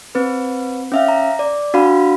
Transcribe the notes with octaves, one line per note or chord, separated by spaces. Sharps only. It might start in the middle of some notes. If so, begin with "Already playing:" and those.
C4 B4
C#4 E5 F5
A#5
D5
D4 F#4 F5 B5